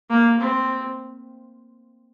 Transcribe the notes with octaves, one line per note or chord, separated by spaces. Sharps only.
A#3
C4